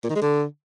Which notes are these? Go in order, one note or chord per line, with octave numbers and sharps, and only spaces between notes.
A#2
D#3
G#3
D3